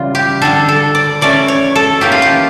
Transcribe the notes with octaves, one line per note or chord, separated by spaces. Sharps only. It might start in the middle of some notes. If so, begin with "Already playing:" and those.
Already playing: C#3 E3 G3 F4
G4
D3 G3 D4 A4
A4
D5
E3 A3 C#4 D5
C#5
A4
E3 A#3 C#4 G4
F4
G4